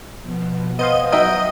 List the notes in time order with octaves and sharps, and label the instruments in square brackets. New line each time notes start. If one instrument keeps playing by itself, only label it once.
[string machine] B2 F3 B3
[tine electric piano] B3 C5 F5 [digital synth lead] D#5 [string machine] G#5
[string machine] F#3 [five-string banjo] D#4 F#4 E5 [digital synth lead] D#5 [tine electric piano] G5 G6